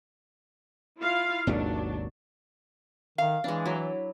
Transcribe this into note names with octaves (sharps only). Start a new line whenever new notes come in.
E4 F4 F5
G#1 D#2 B2 F#3 D4
D#3 F5
E3 G#3 D4
F#3 E4